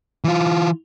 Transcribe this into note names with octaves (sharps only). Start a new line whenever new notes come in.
E3 F4